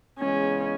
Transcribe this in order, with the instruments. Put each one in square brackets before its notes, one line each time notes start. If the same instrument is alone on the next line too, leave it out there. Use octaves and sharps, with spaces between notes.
[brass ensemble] E2 C#3 G#3 [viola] C#4